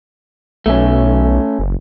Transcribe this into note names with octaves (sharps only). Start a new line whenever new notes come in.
B1 A3 C#4
F#1